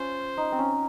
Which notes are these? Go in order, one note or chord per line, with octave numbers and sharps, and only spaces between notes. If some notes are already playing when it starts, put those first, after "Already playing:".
Already playing: C#4 F4 C5
D#4
C4
C#4